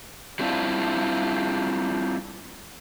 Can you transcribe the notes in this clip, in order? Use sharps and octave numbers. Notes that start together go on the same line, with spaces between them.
F#3 G3 C4 D4 E4 F4